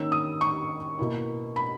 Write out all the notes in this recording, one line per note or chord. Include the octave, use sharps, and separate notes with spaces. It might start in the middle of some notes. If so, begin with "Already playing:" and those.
Already playing: D#3 A#3 C#4 E6
D#6
C#6
B2 A#3 E4
B5